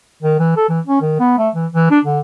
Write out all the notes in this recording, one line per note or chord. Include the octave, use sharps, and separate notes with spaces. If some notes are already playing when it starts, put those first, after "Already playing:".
D#3
E3
A4
E3
C#4
D#3
B3
A3
E3
E3
D4
D3